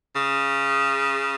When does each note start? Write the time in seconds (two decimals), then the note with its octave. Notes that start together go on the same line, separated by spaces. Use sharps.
0.16 C#3